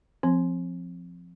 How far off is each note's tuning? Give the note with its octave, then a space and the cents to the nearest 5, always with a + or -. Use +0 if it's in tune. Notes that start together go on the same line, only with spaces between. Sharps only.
F3 +0 C4 +0